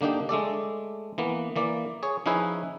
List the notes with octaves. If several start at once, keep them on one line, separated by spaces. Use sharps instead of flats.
D3 A#3 D4 D#4 G4
G#3 A3 A4 D5
E3 A#3 B3
E3 A#3 D5
G#4 C#5
F3 C#4 D#4 E4 G#4 B4